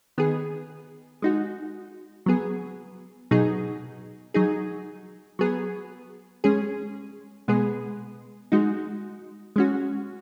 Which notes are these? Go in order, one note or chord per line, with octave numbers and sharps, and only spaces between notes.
D#3 B3 G#4
G#3 D#4 F#4
F#3 B3 G#4
B2 F#3 D#4 G#4
F#3 D#4 G#4
F#3 B3 G#4
G#3 C#4 G#4
B2 G#3 B3 G#4
G#3 D#4 F#4
G#3 C#4 F#4